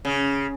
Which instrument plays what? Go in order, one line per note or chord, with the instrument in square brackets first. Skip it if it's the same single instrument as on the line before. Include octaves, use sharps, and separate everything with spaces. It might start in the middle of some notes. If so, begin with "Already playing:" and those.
[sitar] C#3